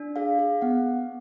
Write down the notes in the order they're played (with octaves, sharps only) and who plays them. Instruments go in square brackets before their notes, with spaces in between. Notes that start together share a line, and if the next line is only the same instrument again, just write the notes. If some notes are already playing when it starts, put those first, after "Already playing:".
Already playing: [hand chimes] D4
G#4 F5
G#4
B3 F#5